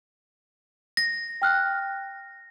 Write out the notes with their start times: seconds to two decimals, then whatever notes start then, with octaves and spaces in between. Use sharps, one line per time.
0.97 A#6
1.42 G5 F6 F#6